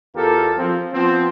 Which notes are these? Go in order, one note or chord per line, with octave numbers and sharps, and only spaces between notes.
E2 F4 G4 A4 A#4
F3 C4
F3 B3 C4